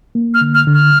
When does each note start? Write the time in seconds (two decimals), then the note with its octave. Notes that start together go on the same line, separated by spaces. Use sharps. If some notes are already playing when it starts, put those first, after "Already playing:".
0.15 A#3
0.34 F6
0.41 D3
0.55 F6
0.67 D3
0.74 F6